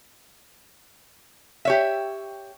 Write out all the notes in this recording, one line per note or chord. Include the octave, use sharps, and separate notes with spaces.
G4 C#5 E5